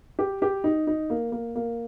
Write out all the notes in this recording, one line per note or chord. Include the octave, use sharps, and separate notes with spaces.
G4
G4
D#4
D#4
A#3
A#3
A#3